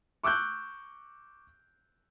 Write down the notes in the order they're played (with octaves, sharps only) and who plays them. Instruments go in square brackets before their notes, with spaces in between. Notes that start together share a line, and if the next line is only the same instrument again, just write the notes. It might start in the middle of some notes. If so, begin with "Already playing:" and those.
[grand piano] C#6 D6 E6 F#6 G6